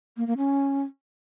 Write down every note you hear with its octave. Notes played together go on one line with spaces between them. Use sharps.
A#3
A#3
C#4